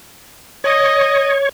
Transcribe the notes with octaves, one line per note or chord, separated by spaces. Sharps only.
C#5 D#5